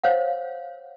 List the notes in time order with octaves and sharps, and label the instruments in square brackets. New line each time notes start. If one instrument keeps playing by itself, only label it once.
[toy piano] C5 C#5 F5 F#5